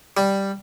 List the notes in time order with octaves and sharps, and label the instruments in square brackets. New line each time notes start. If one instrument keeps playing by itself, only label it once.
[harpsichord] G3